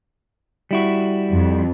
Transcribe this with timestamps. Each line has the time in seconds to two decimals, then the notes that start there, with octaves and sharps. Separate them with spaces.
0.71 G3 E4 F#4
1.31 F2